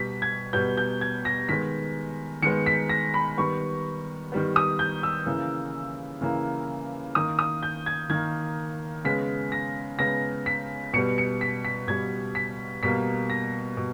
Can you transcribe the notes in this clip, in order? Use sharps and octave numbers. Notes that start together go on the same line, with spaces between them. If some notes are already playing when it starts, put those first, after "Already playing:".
Already playing: B2 G3 B3 B6
G#6
B2 G3 B3 G6
G6
G#6
A#6
D#3 G#3 B3 B6
D#3 G#3 B3 C#7
B6
A#6
B5
D#3 G3 B3 C#6
D#3 G3 B3
D#6
G6
E6
C#3 E3 A#3
C#3 E3 A#3
D#3 A#3 D#6
D#6
G6
G#6
D#3 A#3 G#6
C#3 G#3 B3 B6
A#6
C#3 G#3 B3 A#6
B6
B2 G3 B3 C#7
C#7
B6
B6
B2 G3 B3 G#6
B6
B2 G3 A#3 B6
A#6
B2